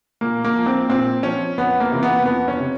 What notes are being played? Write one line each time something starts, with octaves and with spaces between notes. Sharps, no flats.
A#2 A#3
A#3
F3
C4
A#2 C4
F3 C#4
F2 B3
A#3
C3 E3
B3
F2 B3
C#4
C3